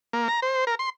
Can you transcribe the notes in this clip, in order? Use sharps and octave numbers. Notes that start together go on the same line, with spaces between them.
A#3
A#5
C5
A#4
C6